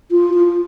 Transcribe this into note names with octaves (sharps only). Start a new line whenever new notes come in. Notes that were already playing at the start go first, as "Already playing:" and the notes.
F4
F4